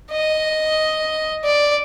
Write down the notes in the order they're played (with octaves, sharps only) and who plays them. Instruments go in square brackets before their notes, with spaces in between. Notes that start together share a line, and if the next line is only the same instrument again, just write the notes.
[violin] D#5
D5